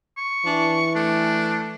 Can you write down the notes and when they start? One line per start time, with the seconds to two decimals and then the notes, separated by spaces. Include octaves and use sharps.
0.17 C#6
0.46 E3 D4
0.95 A3 D4